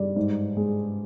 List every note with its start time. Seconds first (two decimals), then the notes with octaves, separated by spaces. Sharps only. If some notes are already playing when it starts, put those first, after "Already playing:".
Already playing: G2 G3 D5
0.16 G#2
0.57 G#3